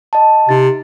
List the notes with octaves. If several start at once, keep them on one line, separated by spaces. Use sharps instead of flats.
D#5 A5
C3 D#4 A6